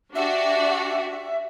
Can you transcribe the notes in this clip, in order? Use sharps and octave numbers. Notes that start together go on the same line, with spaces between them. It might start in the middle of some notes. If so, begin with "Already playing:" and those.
D4 F#4 G4 E5